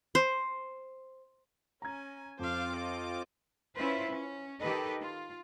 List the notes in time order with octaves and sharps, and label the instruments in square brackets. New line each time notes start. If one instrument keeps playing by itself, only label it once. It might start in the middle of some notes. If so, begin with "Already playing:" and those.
[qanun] C5
[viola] C#4 G#5 [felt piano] A#5 G#6
[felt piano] F2 [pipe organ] C4 F4 D6 [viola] C5 F5
[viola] A4 D#5
[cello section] C#4 E4 F4 B4 C5
C#4
D#3 G4 A4 B4 D#5
F4